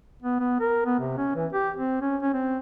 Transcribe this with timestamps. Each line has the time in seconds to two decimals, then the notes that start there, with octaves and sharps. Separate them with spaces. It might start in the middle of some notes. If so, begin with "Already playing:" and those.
0.22 B3
0.39 B3
0.60 A#4
0.86 B3
0.99 C3
1.17 C#4
1.35 E3
1.53 G4
1.76 C4
2.01 C#4
2.22 C#4
2.33 C4